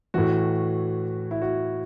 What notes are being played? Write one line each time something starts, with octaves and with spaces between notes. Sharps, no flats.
A2 E3 F#4
E4
F#4